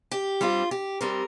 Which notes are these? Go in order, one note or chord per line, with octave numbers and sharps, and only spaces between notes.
G4
G2 G3 C4 F4
G4
G2 G3 C4 A#4